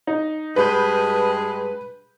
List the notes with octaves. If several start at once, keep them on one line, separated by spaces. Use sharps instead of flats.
D#4
G2 G#3 B4 B5 G6